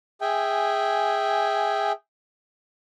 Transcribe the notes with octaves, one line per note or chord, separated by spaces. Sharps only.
G#4 E5 G5 G#5